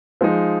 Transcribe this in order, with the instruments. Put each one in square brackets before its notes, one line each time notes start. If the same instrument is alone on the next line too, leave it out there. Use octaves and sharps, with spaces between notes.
[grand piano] F3 G#3 D#4